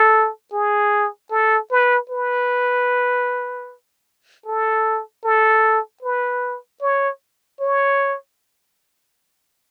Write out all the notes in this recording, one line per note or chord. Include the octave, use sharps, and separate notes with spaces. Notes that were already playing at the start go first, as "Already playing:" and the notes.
Already playing: A4
G#4
A4
B4
B4
A4
A4
B4
C#5
C#5